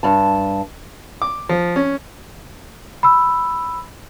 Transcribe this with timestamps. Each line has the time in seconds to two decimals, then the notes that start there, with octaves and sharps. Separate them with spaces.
0.03 G2 A5
1.22 D6
1.49 F3
1.76 C#4
3.03 B5 E6